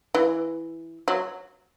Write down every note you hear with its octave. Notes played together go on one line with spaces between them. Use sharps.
E3
F#3